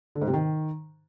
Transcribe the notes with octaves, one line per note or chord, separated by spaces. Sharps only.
D3
G#2
C3
D#3